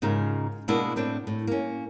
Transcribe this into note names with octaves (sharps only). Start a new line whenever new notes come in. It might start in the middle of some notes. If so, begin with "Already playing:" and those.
G#2 C#3 D#4 F4 A#4
B2 G#3 A#3 B3 D4 E4
A2 C4 D4
A2
A#3 C#4